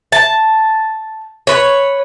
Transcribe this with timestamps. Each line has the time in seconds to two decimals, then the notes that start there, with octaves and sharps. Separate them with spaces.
0.12 A5
1.47 B4 C#5